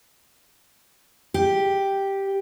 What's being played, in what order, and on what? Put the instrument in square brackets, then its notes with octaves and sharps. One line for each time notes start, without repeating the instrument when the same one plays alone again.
[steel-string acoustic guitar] G4